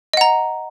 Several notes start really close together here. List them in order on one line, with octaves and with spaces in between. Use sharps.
D#5 F#5 A#5